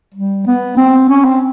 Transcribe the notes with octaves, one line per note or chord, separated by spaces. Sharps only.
G3
B3
C4
C#4
C4